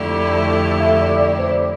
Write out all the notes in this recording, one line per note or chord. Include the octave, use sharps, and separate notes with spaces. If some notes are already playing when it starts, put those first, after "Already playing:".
Already playing: F2 D3 A3 E4 G4 D5
E5
D5
D5
C5